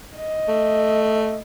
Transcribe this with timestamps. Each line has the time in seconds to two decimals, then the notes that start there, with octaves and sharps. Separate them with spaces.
0.17 D#5
0.48 A3